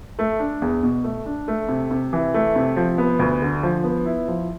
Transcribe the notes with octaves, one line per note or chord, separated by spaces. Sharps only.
A3
D4
E2
B2
A3
D4
A3
C3
C3
E3
A3
C3
F3
B3
D2
D3
F3
B3
E4
F3